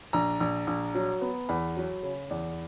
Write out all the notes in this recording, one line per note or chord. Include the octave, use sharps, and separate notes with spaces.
A#1 A#5
A#1
A#1
F#3
B3
E2 B5
F#3
C#3
E2